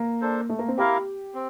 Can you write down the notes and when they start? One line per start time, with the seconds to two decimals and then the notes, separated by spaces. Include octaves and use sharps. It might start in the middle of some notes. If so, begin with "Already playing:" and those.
Already playing: A#3
0.21 D4 A4 C5
0.49 A3
0.59 A#3
0.68 C4
0.77 A#3 E4 G4 A#4 F5
1.34 C4